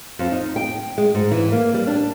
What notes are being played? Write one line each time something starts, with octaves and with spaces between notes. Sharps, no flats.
F2
D#4
G5
G#3
G#2
E3
A#3
G3
D4